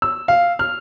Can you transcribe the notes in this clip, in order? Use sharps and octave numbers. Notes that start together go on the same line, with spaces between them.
E6
F5
F6